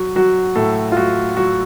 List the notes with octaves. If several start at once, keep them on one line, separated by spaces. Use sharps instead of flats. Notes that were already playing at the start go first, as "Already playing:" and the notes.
Already playing: F#3 F#4
F#3 F#4
A2 A4
F4
F#3 F#4
F#3 F#4